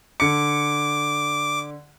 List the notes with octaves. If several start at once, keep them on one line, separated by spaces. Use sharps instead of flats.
D3 D6 C#7